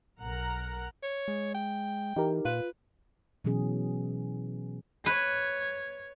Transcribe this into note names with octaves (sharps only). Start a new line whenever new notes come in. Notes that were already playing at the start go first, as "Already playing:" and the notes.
B1 A#4 F#5 A#5
C#5
G#3
G5
E3 D#4 G4 A#4
A#2 F4 B4
B2 E3 F#3 C#4 G#4
B4 C#5